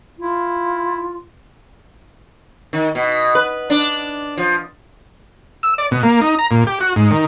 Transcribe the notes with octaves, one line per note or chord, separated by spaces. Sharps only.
E4 F4
D#3
B2
B4
D4
F3
E6
D5
B2
A#3
D#4
A#5
A#2
G4
F#4
G#2
D#3